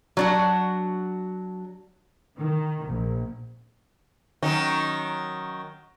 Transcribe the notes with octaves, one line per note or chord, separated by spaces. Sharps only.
F#3 D4 F#4
D#3
A#1
D#3 F#3 C#4